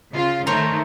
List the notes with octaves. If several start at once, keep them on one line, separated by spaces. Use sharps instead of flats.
C#3 F4
D#3 A3 A#4 C5 C#5